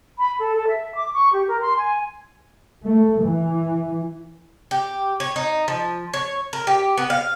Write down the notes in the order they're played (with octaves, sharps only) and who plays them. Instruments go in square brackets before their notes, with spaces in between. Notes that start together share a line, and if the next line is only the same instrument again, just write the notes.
[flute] B5
A4
A4
E5
D6
C#6
G4
A#4
C6
G#5
[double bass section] A3
E3
[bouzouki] G4
C#5
D#4
F3
C#5
A#4
G4
B3
F5